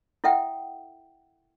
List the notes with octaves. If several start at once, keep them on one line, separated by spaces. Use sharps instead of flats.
E4 A4 E5 F#5 G5